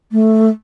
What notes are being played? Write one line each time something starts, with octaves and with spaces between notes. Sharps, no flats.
A3